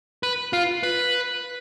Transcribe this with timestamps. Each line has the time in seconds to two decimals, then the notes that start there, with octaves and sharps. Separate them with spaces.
0.23 B4
0.53 F4
0.83 B4